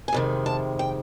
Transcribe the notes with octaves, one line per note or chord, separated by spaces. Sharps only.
G#5
F2 C3 D#3 G#3
A5
G5